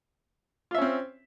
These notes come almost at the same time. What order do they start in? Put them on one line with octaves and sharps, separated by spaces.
F4 E5 C#4 C4